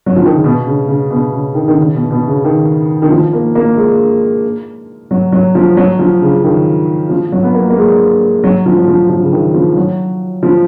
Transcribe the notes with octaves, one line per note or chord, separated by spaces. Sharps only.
F#3
F3
D#3
C#3
B2
C#3
C#3
B2
C#3
D#3
D#3
C#3
B2
B2
C#3
D#3
D#3
F3
A#3
A#3
G#3
F#3
F#3
F3
F#3
F3
C#3
D#3
F3
F#3
B3
A#3
A#3
G#3
F#3
F3
F#3
F3
F3
C#3
D#3
F3
F#3
F3